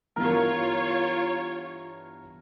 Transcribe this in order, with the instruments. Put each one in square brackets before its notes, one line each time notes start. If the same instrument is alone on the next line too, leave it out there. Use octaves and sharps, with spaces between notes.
[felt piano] G2 E3 B3 [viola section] F4 C#5 [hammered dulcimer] A#4